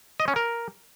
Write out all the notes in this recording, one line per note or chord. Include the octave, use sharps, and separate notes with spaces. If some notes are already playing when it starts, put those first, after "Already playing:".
D#5
C#4
A#4